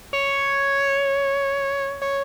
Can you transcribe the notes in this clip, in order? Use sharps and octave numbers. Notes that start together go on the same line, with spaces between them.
C#5
C#5